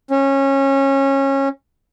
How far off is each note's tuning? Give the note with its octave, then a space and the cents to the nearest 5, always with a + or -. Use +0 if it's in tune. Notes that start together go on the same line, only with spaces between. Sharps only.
C#4 -20